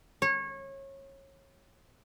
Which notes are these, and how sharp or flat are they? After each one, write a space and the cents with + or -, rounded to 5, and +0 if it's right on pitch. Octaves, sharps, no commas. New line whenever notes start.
C#5 -25